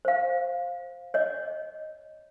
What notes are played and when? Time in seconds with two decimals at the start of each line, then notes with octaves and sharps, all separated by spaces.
0.05 C5 F5
1.14 C#5 D#5